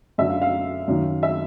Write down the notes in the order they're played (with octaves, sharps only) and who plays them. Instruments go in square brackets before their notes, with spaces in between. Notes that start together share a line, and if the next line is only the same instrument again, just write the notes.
[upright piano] F#2 D3 E5
F5
F5
F#2 D#3
E5